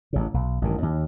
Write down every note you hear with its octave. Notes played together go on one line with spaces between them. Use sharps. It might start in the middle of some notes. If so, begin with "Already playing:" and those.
A1 C#3
B1
A1 G2 D#3
D#2